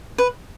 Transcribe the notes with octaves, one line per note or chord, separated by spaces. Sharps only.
B4